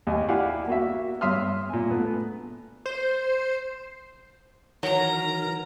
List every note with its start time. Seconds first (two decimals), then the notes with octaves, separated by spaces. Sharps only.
0.07 D#2 D#5 G#5
0.28 E4 G4 D5 F5 F#5 G#5
0.68 A#3 F#4 E5
1.21 G2 C#5 E5 C6 D#6 F6
1.69 A#2 G#5
1.91 A3 B3
2.86 C5
4.83 D#3 E3 F#3 A#4 A#5